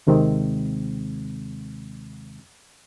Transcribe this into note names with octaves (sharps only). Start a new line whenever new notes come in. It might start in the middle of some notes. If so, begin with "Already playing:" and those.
D#2 C3 D#3 G#3 C4